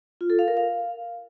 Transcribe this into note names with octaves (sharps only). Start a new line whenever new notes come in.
F4
A4
F5
A#4
F5